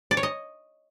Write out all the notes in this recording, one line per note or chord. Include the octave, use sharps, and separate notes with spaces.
D5
C#5
D#5